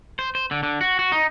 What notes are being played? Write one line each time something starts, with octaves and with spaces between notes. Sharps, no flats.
C5
C5
D3
D3
F#4
F#4
D#4